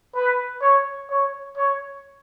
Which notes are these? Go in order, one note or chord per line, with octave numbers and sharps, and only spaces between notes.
B4
C#5
C#5
C#5